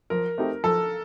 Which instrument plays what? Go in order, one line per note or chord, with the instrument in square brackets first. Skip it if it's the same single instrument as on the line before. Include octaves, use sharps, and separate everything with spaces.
[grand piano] F3 [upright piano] A#4
[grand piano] A3 C4 D#4 G4
[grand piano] F3 [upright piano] A4